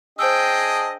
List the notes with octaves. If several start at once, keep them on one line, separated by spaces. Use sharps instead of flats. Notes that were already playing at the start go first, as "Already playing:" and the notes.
D4 G#4 C5 D#5 G5 E6